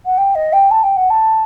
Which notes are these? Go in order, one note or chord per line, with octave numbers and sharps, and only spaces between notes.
F#5
G5
D#5
G5
A5
G5
F#5
A5